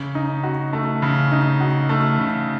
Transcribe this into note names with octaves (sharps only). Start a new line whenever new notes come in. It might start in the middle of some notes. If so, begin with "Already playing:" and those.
Already playing: C#3
D#4
F#4
A3
C#3
D#4
F#4
A3
C#3